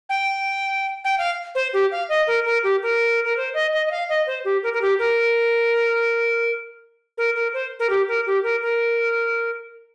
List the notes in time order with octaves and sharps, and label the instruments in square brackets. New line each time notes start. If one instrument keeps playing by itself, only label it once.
[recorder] G5
G5
F5
C5
G4
F5
D#5
A#4
A#4
G4
A#4
A#4
C5
D#5
D#5
D#5
F5
D#5
C5
G4
A#4
A#4
G4
A#4
A#4
A#4
C5
A#4
G4
A#4
G4
A#4
A#4